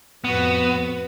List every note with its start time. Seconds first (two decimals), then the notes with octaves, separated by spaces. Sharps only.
0.24 F2 A2 B3 F#4 B4